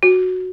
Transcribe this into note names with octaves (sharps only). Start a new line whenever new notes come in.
F#4